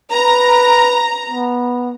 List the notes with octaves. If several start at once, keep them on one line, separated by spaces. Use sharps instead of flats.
B4 A#5
B3